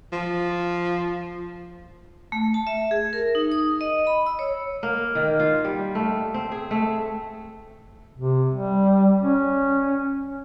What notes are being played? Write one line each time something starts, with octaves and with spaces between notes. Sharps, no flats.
F3
A3
A5
E5
G#4
A#4
D#4
D#6
D#5
B5
E6
C#5
A#3
D#3
F4
G3
A3
C4
G#4
A3
C3
G3
C#4